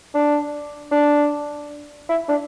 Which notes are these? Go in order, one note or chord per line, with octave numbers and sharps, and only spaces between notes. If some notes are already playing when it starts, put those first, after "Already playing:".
D4
D4
E4
D4